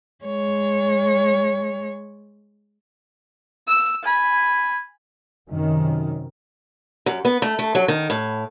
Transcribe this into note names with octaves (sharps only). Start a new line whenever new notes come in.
G#3 C#5
E6
G#5 B5
F#2 C3 D#3
F#2
B3
A3
A3
F#3
D#3
A2